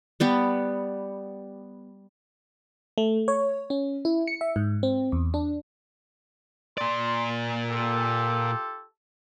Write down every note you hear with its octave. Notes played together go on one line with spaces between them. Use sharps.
G3 B3 G4
A3
C#5
C#4
E4
C#7
E5
G#2
C4
E2
D4
A#2 D5 C6
F4 G4 A4